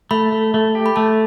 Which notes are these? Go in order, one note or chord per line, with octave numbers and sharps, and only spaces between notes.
A3 B5
A3
A3
G4
B5
A3 A5